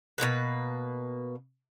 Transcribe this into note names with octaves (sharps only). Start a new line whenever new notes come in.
B2 D#3 A#3 B4